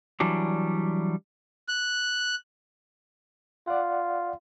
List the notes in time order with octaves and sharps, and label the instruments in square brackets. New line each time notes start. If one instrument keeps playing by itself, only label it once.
[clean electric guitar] E3 F#3 G3 D4
[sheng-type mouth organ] F#6
[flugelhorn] F4 [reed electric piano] D5 F#5